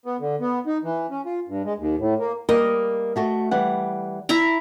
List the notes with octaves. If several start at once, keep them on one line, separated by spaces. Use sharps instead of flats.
B3
D3
B3
D#4
E3
C#4
F4
G2
G#3
D#2
A2
A#3
G3 A#3 A#4 D#5
A3 F#4 A4
E3 G3 F#5
E4 E5 A#5